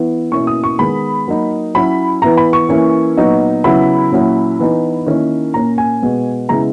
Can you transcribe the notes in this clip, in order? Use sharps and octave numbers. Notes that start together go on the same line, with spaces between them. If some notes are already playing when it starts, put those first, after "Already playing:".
Already playing: E3 B3 E4
B2 A#3 C#4 E4 C#6
D#6
C#6
D#3 G#3 B3 B5
F#3 A#3 D#4
F#3 C#4 E4 B5
E3 B3 E4 A#5
B5
C#6
E3 A#3 C#4 E4
A#2 F#3 B3 D#4
C#3 F#3 B3 E4 B5
A#2 F#3 C#4 E4
E3 B3 D#4
D#3 A#3 C#4 E4
A#2 A#3 C#4 A#5
G#5
B2 G#3 B3
C#3 G#3 B3 E4 A#5